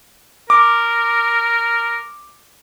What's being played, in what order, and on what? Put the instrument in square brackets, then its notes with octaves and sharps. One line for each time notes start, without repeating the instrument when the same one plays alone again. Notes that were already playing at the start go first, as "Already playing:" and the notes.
[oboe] A#4 [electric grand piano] D6